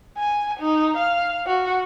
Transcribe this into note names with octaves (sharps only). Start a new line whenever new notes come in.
G#5
D#4
F5
F#4